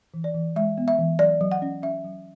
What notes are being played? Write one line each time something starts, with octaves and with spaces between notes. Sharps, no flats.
E3
D5
E3
G#3 E5
B3
E5
E3
F#3 D5
F#3
F#5
C#4
C#4 E5
F#3